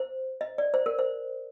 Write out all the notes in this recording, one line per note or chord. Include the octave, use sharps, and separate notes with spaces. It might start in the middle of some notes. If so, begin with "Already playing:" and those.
Already playing: C5
D#5
D5
C5
A#4
C5